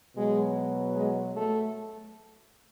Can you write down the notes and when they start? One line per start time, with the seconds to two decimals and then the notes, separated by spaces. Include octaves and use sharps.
0.16 B2 F#3 G#3
0.95 G#3
1.35 A3